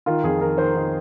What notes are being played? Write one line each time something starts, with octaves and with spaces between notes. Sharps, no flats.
D#3 F4
F2 G#4
D#3 A#4
D#3 C5
D#3